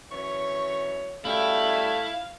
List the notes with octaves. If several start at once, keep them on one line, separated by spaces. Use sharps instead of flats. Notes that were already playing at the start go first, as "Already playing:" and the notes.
F#2 E3 C#5 C#6
F#2 G3 A3 E4 F5 G5